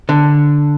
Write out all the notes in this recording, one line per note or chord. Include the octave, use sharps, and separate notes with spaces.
D3